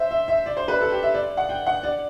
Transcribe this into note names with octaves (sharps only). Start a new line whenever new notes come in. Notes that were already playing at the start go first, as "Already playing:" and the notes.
Already playing: C5 E5
E5
E5
D5
C5
B4
A4
G4
E5
D5
F#5
G5
F#5
D5